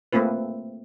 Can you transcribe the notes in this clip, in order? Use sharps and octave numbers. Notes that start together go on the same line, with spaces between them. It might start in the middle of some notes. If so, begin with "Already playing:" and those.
A3 A#3 C4 F4 B4